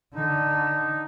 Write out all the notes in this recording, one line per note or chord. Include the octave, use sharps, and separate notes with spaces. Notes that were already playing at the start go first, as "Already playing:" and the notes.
D3 D#4